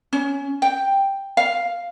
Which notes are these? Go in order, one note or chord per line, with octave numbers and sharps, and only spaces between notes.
C#4
G5
F5